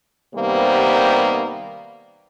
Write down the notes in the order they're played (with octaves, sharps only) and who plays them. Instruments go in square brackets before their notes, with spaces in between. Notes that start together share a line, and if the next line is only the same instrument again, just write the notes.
[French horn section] C3 D#3 G3 A#3 B3 C5